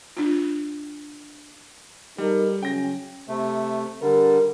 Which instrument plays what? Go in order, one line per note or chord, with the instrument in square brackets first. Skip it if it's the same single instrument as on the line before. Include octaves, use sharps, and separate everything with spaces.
[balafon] D4 F4
[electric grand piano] G3 [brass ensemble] D#4 A4 A#4
[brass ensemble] C#3 F#3 C#4 [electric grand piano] G5 A#6
[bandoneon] C3 A3
[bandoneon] D3 G3 [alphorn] A#4